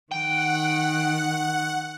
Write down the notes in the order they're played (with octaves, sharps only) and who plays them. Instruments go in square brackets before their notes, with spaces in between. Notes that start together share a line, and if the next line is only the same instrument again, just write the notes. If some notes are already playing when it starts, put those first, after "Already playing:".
[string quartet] D#3 [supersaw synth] F#5 [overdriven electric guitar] G5